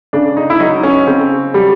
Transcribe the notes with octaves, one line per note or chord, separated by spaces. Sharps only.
C#3 D4
D#4
E4
F#3 D#4
C#4
C#3 C4
F#3 G3